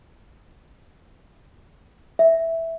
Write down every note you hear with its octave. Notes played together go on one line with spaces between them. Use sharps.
E5